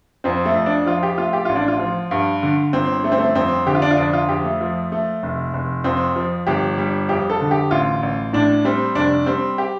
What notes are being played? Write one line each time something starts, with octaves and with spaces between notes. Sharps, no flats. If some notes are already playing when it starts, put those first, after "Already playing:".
F2 C4
A3
F2
D4
F3 F4
G4
A3 F4
G4
A1 F4
D4
F4
F3
G2
D3
G1 C4
A3
C4
A3
F2 C4
D3 G4
F4
D4
F4
F2 D4
F4
F2 G4
A3
F3
A3
F1
F1
F2 C4
F3
G1 G4
G3
F2 G4
A4
D3
G4
A1 F4
A1
A2 D4
G3 C4
F1 D4
G3 C4
G4